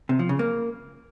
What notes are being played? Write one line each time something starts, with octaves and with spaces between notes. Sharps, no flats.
C3
F3
C#3
A#3